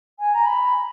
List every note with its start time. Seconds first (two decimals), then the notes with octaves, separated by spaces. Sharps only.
0.19 G#5
0.34 A#5
0.46 B5